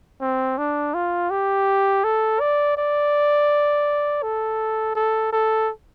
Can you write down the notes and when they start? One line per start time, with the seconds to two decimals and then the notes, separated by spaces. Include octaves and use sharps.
0.21 C4
0.58 D4
0.94 F4
1.30 G4
2.04 A4
2.40 D5
2.77 D5
4.22 A4
4.95 A4
5.32 A4